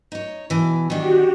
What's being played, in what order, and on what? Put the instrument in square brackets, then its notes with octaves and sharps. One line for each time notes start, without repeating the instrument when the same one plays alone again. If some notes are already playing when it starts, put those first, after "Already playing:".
[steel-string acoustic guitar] D#4 C#5
B2 E3
[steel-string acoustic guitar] D#3 D4 [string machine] F#4 G4